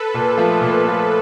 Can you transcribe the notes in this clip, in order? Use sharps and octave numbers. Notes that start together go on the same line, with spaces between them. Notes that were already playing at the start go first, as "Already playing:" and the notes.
Already playing: A4 B4
A#2
F3 A3
A#2
F3 A3